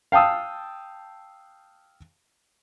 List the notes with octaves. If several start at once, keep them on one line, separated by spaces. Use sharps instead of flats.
F5 G5 A5 D#6 E6